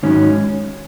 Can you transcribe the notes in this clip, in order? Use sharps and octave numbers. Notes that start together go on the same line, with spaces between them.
G#2 D#3 F#3 C#4